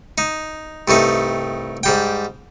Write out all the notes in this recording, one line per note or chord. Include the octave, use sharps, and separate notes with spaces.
D#4
C2 G2 A3 D#4
G#2 G3 G5